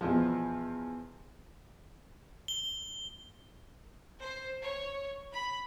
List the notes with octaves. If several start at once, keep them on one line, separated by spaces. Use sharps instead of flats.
E2 B2 F3
G7
C5
C#5
B5